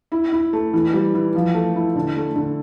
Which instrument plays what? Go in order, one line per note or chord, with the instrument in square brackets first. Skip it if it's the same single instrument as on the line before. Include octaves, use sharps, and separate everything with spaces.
[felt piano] E4
E4
A3
E3
G3
E3
F3
A3
E4
D3
A3
D3